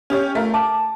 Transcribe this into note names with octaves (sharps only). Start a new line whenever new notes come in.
C#4 G4 C#5
A3 F4 A#4
A5 D6